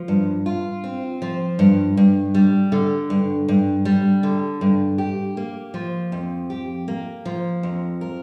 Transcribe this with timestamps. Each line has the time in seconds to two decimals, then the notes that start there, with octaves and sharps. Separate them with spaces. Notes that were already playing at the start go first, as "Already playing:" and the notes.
Already playing: F3
0.08 G2
0.46 F4
0.84 C4
1.22 F3
1.59 G2
1.97 G2
2.35 G3
2.72 D3
3.10 G2
3.48 G2
3.85 G3
4.23 D3
4.61 G2
4.98 G4
5.37 A#3
5.74 F3
6.12 F2
6.50 G4
6.88 A#3
7.25 F3
7.63 F2
8.01 A#4